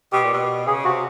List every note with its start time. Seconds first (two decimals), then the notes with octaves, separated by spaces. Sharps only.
0.12 B2 G4
0.24 A#2
0.33 B2
0.67 C#3 G#4
0.84 C3 F#4